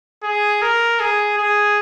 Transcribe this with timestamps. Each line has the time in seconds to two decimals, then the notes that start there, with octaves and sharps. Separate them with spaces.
0.24 G#4
0.62 A#4
1.00 G#4
1.38 G#4